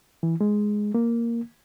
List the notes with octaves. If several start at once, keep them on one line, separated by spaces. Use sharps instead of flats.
E3
G#3
A#3